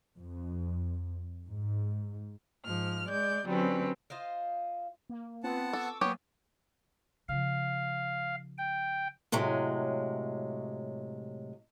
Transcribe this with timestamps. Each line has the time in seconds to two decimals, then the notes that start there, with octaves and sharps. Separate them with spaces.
0.18 F2
1.49 G#2
2.64 G#2 F3 F6
3.09 G#3 D5 G6
3.46 D3 F#3 G3 C4 C#4 B4
4.10 F4 C5 D#5 F5
5.09 A#3
5.44 B3 C4 F4 B4 F#5 A5
5.73 A4 C#6 D6 E6
6.01 F#3 A#3 B3 G4 C#5 G#5
7.29 C#3 F3 F5
8.58 G5
9.32 A2 C3 F#3 G#3